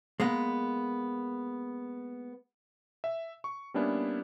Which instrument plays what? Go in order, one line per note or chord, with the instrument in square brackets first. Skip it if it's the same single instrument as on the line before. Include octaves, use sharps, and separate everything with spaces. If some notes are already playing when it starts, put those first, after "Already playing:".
[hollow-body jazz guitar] G#3 A#3 B3
[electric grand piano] E5
C#6
G3 A#3 B3 C#4 D4 E4